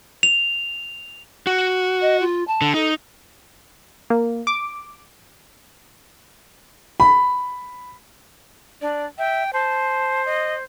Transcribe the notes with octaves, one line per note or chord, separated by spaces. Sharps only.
F7
F#4
D#5
F4
A5
D3
D#4 A4
A#3
D6
B5
D4 D5
E5 G5
C5 A5
D#5